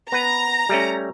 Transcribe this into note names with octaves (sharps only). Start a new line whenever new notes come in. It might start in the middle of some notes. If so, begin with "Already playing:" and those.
B3 B4 A#5
G3 A3 C#4